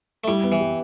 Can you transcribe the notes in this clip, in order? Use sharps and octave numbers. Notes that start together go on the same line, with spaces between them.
A3
G3 E4
B3
E3
G4